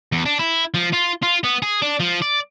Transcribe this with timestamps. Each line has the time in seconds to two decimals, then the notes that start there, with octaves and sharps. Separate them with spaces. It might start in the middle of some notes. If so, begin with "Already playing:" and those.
0.12 E2
0.26 D4
0.39 E4
0.74 F3
0.93 F4
1.23 F4
1.44 B3
1.62 G#4
1.82 D4
2.00 F3
2.22 D5